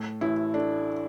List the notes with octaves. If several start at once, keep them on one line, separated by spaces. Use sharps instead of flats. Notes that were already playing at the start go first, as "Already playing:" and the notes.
Already playing: A2
A1 E4
A3 D4